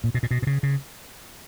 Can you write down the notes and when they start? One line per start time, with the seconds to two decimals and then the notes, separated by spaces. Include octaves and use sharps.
0.04 A#2
0.14 B2
0.23 A#2
0.31 B2
0.42 B2
0.47 C#3
0.63 C#3